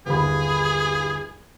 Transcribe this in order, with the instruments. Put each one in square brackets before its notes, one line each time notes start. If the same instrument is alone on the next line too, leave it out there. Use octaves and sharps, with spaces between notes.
[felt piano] G1 D#2 B5 [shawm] G#4